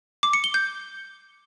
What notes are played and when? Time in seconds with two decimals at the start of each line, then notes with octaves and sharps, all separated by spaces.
0.23 D6
0.33 C#7
0.44 G7
0.54 G6